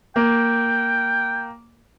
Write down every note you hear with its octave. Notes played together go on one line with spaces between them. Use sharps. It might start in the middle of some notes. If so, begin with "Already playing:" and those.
A#3 G5